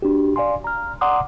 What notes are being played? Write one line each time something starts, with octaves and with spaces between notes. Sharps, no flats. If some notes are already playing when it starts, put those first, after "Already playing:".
D4 F#4 G4
D5 F5 G#5 C6
A#5 F6
D5 F#5 A#5 C6 D6 D#6